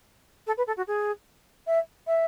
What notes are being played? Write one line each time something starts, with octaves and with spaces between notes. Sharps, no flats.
A4
B4
A4
F#4
G#4
E5
E5